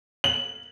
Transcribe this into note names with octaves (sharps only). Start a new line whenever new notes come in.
F#7